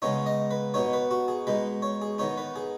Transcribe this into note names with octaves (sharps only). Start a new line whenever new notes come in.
C#3 G#3 B3 D#4 C#5
D#5
B4
B2 B3 D#4 C#5
B4
F#4
G#4
B2 G#3 D#4 B4
C#5
G#4
D#3 B3 D#4 C#5
B4
G#4